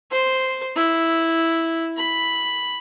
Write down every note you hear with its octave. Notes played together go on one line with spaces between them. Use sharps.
C5
E4
B5